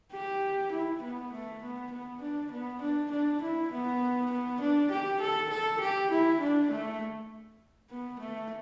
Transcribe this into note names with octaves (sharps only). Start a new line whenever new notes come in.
G4
E4
B3
A3
B3
B3
D4
B3
D4
D4
E4
B3
B3
D4
G4
A4
A4
G4
E4
D4
A3
B3
A3